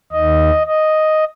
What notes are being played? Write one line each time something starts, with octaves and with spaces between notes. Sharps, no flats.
D#2 D#3 D#5
D#5